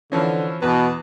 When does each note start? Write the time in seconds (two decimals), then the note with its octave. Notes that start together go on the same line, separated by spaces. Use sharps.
0.12 D3 E3 F3 C#4
0.62 E2 B2 B4